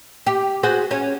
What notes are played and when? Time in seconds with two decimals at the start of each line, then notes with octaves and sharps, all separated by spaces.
0.26 G4
0.63 F#4 G#4 C5
0.91 C#4